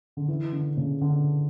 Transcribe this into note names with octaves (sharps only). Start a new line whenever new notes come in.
D3
E3
D3
C#3
D3